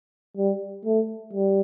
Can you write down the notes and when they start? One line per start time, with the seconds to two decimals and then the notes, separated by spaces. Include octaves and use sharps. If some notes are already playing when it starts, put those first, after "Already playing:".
0.37 G3
0.85 A3
1.33 G3